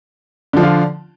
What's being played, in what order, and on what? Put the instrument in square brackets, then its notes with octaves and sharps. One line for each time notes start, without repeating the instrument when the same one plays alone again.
[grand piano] D3
F3
D4
F4